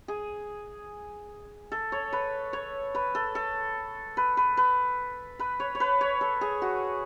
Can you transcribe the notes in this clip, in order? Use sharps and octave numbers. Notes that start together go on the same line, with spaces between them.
G#4
A4
C#5
B4
C#5
B4
A4
A4
B4
B4
B4
B4
C#5
C#5
B4
C#5
A4
G#4
F#4